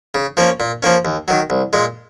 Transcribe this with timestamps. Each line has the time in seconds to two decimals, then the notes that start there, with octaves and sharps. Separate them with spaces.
0.14 C#3
0.37 F3 A#3 C#4
0.60 A#2
0.83 F3 A#3 C#4
1.05 D#2
1.28 D#3 F#3
1.50 C2
1.73 A#2 G#3